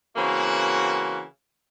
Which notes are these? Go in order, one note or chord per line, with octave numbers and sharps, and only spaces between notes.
C#3 E3 A#3 C4 F#4